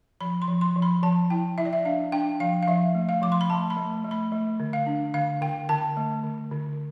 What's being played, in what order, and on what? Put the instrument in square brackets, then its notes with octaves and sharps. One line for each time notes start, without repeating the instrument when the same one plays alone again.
[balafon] F3 B5
C6
F3
C6
F3
B5
F3 A5
E4 G5
E4 E5
D5
E5
D4 F5
D4 G5
F3 F5
F5
F3 E5
A3
F5
F3 D6
C6
B5
A3 A5
B5
A3
A3
B5
A3
D3
F5
D4
D3 F5
D3 G5
D3 A5
A3
D3
D3